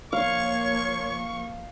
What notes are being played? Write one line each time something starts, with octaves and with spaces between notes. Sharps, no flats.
F3 A#3 C#5 F5 C#6